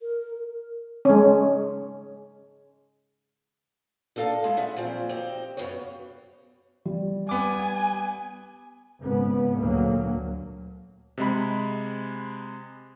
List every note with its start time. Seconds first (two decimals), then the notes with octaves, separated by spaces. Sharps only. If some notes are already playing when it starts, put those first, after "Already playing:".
0.01 A#4
1.05 G#3 C#4
4.16 D4 D#4 A4 F5 A5
4.44 G#3 E4 G#4
4.57 B3 C#4 E5 F#5
4.76 A#2 F3 F#3 C4
5.09 C4 D#4 G4
5.57 F#2 C#3 B3 F#4 C#5
6.85 G3
7.29 B3 G#5 D6
9.01 G#1 C#3 B3
9.60 D2 A#2 F#3 A#3
11.18 C3 G#3 B5